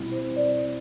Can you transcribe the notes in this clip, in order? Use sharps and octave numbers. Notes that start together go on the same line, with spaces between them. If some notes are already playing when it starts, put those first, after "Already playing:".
Already playing: B2 G3 C4 E4
C5
D5